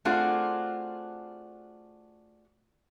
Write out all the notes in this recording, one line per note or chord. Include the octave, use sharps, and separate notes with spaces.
A3 C4 D4 F4 F#4 G#4